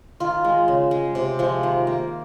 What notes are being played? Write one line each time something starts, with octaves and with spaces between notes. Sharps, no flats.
D#3 F4
G#3
C#3
G#3
C3
F3 G#3
D#3
A#3